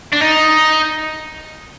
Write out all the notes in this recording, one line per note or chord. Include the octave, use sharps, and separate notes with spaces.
D4
D#4